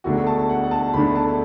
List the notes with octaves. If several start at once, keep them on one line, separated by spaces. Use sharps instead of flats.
E1 D2 D3 A3 D4 F#4
A5
F#5
F#5
A5
E1 D2 D3 A3 D4 B5
A5